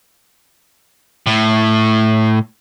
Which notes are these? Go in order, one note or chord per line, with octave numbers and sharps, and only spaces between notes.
A2